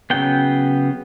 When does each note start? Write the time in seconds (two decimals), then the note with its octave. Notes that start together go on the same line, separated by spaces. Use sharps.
0.10 C#3 F#3 B3 G5